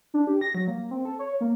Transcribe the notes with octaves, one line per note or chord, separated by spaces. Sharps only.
D4
G4
A#6
F#3
A#3
C4
A4
C#5
A#3